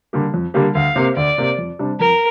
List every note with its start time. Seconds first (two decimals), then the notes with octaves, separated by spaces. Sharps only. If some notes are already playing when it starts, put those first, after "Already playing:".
0.13 D3 G3 A#3 G4
0.34 F2
0.54 D3 G3 A#3 G4
0.75 D2 F5
0.96 C3 A#3 G4
1.17 D2 D5
1.38 C3 A#3 G4
1.58 F2
1.79 C3 G3 D4
2.00 F2 A#4